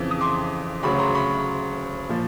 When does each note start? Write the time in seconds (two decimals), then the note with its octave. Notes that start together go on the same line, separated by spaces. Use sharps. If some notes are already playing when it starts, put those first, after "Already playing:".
Already playing: F2 C#3 E3
0.11 D#6
0.21 C6 D6
0.83 D2 C#3 F#3 B5 C#6
0.98 A#5 C6
1.14 B5 C#6
2.09 A#2 F3